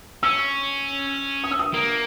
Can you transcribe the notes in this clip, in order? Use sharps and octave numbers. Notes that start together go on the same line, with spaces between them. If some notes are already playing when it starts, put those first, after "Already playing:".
C#4 E6
D#6
E6
D#6
A#3